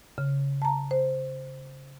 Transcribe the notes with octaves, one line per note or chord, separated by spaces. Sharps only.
C#3
A5 A#5
C5